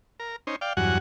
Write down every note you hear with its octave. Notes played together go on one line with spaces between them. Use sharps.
A#4
C#4 D#4 C5
D5 F5 G5
E2 G2 F#3 F#4 F#5 G#5